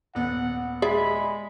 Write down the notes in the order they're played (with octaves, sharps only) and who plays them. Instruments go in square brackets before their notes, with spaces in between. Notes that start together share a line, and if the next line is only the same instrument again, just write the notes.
[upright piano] D#1 B3 [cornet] F#5
[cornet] G#3 [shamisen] G#4 D5 E5 [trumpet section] B5